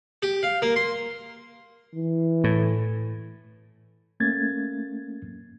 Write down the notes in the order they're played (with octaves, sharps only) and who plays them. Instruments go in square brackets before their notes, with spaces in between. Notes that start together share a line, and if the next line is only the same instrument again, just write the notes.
[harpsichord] G4
F5
A#3
C6
[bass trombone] E3
[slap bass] A2
[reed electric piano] A3 A#3 C#4 G#6 A6